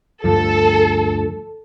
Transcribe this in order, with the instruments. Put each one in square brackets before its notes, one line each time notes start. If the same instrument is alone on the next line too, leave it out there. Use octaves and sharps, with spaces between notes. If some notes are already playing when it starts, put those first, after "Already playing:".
[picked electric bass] D2 G2 F3 [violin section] A4